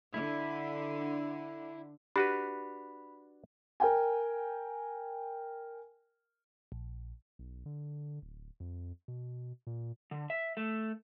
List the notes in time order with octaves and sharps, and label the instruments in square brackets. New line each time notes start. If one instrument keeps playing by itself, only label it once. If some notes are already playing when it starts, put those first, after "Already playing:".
[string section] D3 [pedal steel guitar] E4
[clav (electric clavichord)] D4 F#4 B4 [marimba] G4 [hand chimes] B5
[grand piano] A#4 G5 G#5
[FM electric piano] A#1
[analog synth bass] B1
D3
D1
F2
B2
A#2
[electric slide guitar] D3
E5
A3